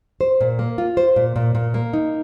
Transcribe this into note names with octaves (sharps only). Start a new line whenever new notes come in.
C5
A#2
A#3
F4
C5
A#2
A#2
A#2
A#3
D#4